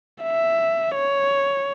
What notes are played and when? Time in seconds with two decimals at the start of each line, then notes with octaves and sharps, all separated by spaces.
0.23 E5
0.95 C#5